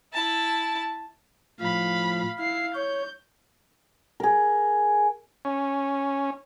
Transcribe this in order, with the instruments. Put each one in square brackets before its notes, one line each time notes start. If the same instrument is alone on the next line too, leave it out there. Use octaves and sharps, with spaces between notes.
[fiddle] E4 A5
[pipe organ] A2 F3 [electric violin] F5 B5
[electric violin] E4 C7 [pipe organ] F5
[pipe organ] C#5 [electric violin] G6
[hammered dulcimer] G#4 A#4
[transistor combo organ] C#4